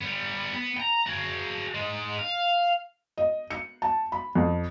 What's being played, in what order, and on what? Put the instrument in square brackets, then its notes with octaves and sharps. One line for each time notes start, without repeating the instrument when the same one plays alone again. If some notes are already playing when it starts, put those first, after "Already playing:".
[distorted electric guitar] G3 B3
B3
G5 A#5
F#4 G#4
G#3 D#4
F5
[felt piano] D#5
C#7
A5
B5
F2